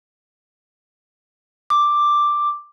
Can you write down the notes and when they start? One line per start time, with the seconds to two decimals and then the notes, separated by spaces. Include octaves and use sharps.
1.70 D6